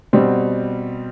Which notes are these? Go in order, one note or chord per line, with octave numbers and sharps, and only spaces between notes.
B2 G3 C4